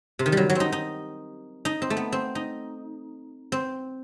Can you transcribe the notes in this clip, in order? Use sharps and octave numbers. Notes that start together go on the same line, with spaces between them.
C3
D#3
F#3 G3
F#3
C4 D#4
D#4
D#4
C4
A3
B3
C4
D#4
C4